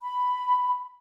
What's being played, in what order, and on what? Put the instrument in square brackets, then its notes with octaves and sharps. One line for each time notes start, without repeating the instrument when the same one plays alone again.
[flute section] B5